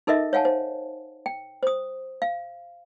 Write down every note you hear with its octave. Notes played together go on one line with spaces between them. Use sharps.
D#4 A4 A#4 D#5 E5
C#5 F5 F#5 G#5 A5
C5
G5
C5 D#6
F5